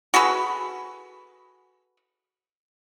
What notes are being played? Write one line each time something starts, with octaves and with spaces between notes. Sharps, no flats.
F#4 G#4 A4 B4